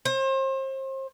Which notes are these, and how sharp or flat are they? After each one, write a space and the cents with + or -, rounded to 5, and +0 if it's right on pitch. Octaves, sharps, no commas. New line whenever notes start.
C5 +35